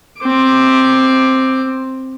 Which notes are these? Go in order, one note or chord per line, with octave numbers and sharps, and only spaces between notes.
C4 D6